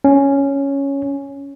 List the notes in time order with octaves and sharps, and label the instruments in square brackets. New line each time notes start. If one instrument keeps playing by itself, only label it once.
[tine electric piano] C#4